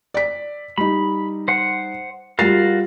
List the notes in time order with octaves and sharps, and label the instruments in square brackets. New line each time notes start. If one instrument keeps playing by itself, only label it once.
[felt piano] D5 B6
[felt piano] G3 D#4 [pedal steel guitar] B5
[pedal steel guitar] C5 F#5
[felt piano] G3 F4 A6 [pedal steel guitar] F#4 A#4 F5